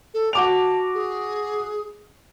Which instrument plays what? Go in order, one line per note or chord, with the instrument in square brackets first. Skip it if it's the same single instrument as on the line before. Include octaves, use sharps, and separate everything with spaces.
[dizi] A4
[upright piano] F#4 D6 F7 [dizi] A5
[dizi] G#4